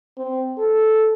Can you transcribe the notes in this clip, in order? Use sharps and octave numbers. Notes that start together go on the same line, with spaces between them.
C4
A4